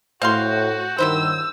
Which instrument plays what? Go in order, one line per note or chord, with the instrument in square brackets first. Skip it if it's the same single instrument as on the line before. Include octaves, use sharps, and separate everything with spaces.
[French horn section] A2 [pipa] C4 F5 C6 [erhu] F#4 [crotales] G6
[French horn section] G2 D#3 [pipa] F#3 E4 C5 [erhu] E6